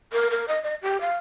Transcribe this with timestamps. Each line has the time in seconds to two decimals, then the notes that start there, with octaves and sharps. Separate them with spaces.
0.13 A#4
0.31 A#4
0.48 D#5
0.63 D#5
0.82 G4
1.01 F5